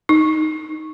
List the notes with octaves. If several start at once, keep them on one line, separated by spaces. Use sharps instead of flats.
D#4